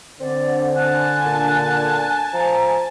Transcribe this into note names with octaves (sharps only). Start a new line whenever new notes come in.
D3 C4 D5
G#5 A5 F#6
A#2
F3 A#5